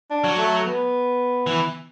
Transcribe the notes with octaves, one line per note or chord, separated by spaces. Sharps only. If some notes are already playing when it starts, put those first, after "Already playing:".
D4
F#3
A3
B3
E3